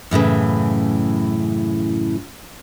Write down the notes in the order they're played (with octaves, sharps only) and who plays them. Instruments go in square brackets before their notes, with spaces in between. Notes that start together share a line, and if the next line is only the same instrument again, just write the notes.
[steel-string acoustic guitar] F#2 A2 C#3 E3